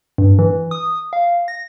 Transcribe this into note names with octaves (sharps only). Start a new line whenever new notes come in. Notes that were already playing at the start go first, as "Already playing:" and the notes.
G2
E3
D#6
F5
A#6